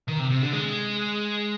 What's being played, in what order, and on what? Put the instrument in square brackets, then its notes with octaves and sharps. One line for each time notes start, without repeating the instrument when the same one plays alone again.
[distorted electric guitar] D#3
C3
C3
D3
G#3